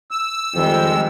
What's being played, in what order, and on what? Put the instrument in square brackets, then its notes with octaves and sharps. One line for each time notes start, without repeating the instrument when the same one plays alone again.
[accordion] E6
[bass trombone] F2 [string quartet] D#3 G3 G#3